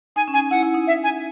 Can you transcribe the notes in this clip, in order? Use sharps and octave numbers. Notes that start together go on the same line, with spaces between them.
D#4 G#5
C#4
G#5
D#4
E4 F#5
E4
D#4
E5
G#5